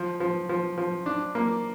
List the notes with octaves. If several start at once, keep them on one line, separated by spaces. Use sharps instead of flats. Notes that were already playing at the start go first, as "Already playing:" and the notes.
Already playing: F3
F3
F3
F3
D4
A#3